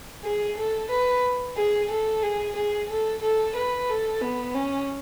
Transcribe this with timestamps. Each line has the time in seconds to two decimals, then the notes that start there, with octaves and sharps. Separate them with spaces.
0.24 G#4
0.57 A4
0.90 B4
1.56 G#4
1.90 A4
2.22 G#4
2.55 G#4
2.90 A4
3.22 A4
3.55 B4
3.89 A4
4.21 B3
4.54 C#4